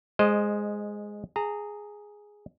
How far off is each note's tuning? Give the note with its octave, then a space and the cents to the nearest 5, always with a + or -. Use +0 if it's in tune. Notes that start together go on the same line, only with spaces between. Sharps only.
G#3 +0 C5 +0 D#5 -15
G#4 +0 A#5 -25